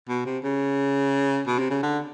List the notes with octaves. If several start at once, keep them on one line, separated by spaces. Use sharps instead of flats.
B2
C3
C#3
B2
C3
C#3
D3